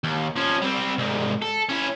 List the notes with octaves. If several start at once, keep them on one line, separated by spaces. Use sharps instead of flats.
D#2
F3 C#4
G3 C4
C2 G#2
A4
C#4 E4